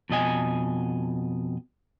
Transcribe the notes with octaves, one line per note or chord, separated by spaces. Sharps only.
F2 B2 D#5 G#5